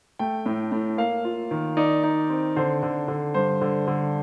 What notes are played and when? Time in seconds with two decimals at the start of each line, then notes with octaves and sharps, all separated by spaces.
0.19 A3 G5
0.46 A2
0.72 A2
0.98 A#3 F5
1.25 F4
1.51 D#3
1.77 D#4 D5
2.04 D#4
2.30 C4
2.56 D3 C5
2.83 D3
3.08 D3
3.34 G2 C5
3.61 D3
3.87 D3